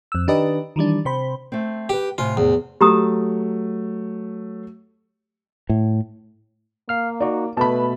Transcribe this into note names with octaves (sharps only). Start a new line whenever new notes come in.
F2 E6
D#3 D4 G4 B4 D#5
D#3 E3 G3 D4
C3 C5 B5
A3 C4
G4 B4 G5
A2 C3 F4 G#5
E2
F#3 A3 G4 A#5 D#6
A2
A#3 F5 F6
D#4 F#4 D5
B2 A3 B4 A5 B5